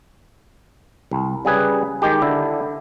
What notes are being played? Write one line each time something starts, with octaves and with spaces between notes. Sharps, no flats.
C2
C#3 G3 G#4 B4
D#3 G#3 G4
D3 E4